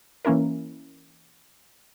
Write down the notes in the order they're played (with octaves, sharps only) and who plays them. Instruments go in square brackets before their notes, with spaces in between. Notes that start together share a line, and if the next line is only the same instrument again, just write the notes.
[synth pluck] E3 A#3 C#4 E4 A#4